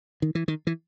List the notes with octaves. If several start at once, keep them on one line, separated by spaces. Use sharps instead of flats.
D#3
E3
D#3
E3